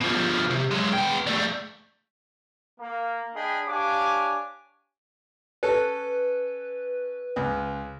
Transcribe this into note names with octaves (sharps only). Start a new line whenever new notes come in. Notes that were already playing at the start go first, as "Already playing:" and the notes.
B2 F3
C3
B1 G#3
B3 G5
G3 A3
A#3
D4 G#4 D#5 G5 B5
D4 G4 C#5 F5 G#5 D6
C#4 A4 B4
C#2